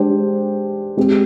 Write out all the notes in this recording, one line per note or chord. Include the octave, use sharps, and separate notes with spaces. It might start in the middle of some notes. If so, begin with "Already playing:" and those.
Already playing: G#3 D4 G4 C5
G#3 C4 G4